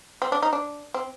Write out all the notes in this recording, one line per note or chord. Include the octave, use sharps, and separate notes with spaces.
C4
D4
D#4
D4
C4